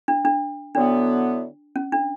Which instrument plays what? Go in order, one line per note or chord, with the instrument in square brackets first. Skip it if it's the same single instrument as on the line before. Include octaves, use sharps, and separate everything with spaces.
[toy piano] D4
D4
[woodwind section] D3 F#3 B3 E4 [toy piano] D4
[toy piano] C#4
D4